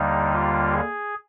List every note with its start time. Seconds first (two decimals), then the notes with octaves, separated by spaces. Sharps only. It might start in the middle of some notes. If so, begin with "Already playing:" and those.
Already playing: D#2 D3 G3 A#3 D#4
0.33 F4
0.73 G#4